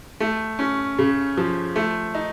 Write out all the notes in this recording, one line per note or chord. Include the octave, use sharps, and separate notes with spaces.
A3
C#4
C#3
F3
A3
D#4